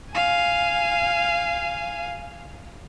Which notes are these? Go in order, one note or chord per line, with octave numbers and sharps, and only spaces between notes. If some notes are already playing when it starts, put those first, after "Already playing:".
F5 G#5